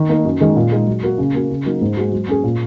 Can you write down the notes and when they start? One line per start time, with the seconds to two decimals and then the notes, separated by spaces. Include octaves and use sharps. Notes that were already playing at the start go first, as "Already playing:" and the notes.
Already playing: D#3
0.09 A#3 D#4 A#4
0.25 F#2
0.40 D#3 G#3 D#4 G#4
0.56 A#2
0.72 G#3 D#4 G#4
0.87 F#3
1.03 A#3 F#4 A#4
1.18 C#3
1.34 A#3 F#4
1.50 C#3
1.65 F#3 A#3 D#4
1.81 G#2
1.97 G#3 F#4
2.12 F#3
2.28 C#4 G#4
2.44 A#2